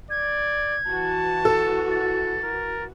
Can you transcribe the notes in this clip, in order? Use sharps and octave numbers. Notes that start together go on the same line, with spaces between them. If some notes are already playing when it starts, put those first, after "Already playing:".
D5 G#6
E3 F#4 A5
A4
A6
A#4